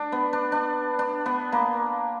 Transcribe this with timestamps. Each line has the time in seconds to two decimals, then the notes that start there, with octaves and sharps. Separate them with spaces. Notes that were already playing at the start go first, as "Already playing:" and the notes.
Already playing: D4
0.12 B3
0.33 D4
0.52 D4
0.99 D4
1.26 B3
1.52 A#3